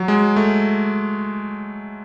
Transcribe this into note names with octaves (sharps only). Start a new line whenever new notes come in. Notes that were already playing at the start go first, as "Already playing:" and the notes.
Already playing: F#3
G#3
A3